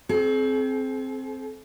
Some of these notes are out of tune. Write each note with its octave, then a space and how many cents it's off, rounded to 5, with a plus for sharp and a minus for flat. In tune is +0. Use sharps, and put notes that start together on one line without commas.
C4 +0 G#4 +40